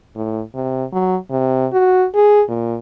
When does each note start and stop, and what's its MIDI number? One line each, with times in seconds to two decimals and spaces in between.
0.16 0.42 45
0.55 0.85 48
0.93 1.16 54
1.31 1.67 48
1.73 2.07 66
2.15 2.43 68
2.49 2.77 46